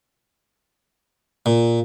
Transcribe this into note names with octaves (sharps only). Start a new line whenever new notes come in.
A#2